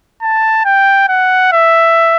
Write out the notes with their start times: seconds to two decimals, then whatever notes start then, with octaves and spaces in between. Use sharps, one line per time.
0.22 A5
0.65 G5
1.09 F#5
1.52 E5